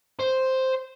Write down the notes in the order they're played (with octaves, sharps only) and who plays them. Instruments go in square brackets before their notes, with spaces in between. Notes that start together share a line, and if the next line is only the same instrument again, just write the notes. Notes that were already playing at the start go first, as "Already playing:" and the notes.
[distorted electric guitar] C5